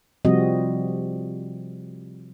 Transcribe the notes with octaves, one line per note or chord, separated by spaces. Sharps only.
C3 F3 G3 C4 F#4 D#5